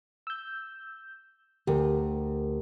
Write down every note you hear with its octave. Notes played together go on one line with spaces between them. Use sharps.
E6 G6
D2 G4 A#4